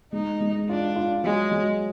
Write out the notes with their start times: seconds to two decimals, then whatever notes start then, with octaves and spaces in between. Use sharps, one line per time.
0.13 G#3 D#4
0.41 G#3
0.69 D4 F4
0.96 F4
1.24 F#3 G#3
1.51 F#3